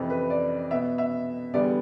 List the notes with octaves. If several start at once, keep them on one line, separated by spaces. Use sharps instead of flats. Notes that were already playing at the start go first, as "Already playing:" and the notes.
Already playing: F2 C3 E3
B4
D5
B2 B3 E5
E5
E2 D3 G3 B3 D5